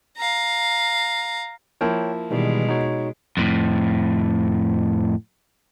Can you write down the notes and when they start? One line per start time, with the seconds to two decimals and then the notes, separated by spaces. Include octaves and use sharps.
0.17 F5 A#5
1.81 F3 A#3 E4 C#5 G5
2.31 B2 D#3 E3 G3 G#3
2.68 D#4 F#4 C#5
3.37 F2 A2